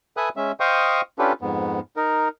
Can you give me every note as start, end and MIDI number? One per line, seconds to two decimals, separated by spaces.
0.17 0.29 69
0.17 0.29 71
0.17 0.29 76
0.17 0.29 80
0.17 0.29 87
0.17 0.29 90
0.37 0.52 56
0.37 0.52 61
0.37 0.52 76
0.60 1.01 72
0.60 1.01 75
0.60 1.01 77
0.60 1.01 79
0.60 1.01 85
0.60 1.01 87
1.19 1.32 61
1.19 1.32 62
1.19 1.32 65
1.19 1.32 67
1.19 1.32 69
1.19 1.32 71
1.41 1.80 41
1.41 1.80 44
1.41 1.80 59
1.97 2.28 63
1.97 2.28 70